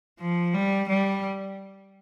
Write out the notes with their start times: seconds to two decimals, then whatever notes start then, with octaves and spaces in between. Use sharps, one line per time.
0.20 F3
0.54 G3
0.89 G3